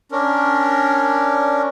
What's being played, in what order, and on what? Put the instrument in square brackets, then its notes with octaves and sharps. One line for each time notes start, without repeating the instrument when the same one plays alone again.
[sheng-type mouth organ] C#4 D4 A#4